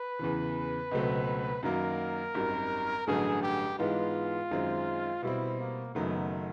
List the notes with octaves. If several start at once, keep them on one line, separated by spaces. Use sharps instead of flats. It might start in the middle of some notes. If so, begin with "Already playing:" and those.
Already playing: B4
E2 C#3 E3
C#2 B2 F#3 A3 C4
F#2 D#3 F#3 A#3 A#4
G#1 F#2 D#3 G3
A1 G2 D3 F#3 A3 G#4
G4
G#2 E3 G#3 B3 F4
F#2 D#3 G#3 C4
B2 G3 C4 E4
A#3
F#1 F#2 D#3 F#3 A3 B3